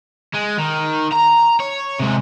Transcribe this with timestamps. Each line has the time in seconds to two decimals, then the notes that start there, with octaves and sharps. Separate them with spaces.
0.34 G#3
0.58 D#3
1.12 A#5
1.60 C#5
2.00 C3 G#3